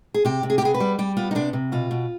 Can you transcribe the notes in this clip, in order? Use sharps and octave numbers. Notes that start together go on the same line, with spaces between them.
G#4
C3 G4
C3
G#4
G4
B3 G#4
B4
G3
G3 G4
B3 F4
D#4
C3 D4
C3
B2 F4
B2